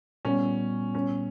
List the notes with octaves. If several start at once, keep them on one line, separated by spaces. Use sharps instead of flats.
A#2 G3 B3 C#4
C#4